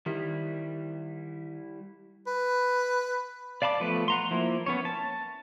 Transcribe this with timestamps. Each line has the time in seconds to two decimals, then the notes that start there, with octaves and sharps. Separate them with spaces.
0.06 D#3 G3 E4
2.27 B4
3.62 D5 F5 A5 B5 D6
3.80 F3 A3 B3 B4
4.08 F#5 A#5 C6
4.31 F3 A#3 E4
4.66 B3 C#4 C#5
4.85 A5